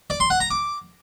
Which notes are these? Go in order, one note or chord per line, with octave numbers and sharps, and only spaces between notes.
D5
C6
F#5
A#5
D6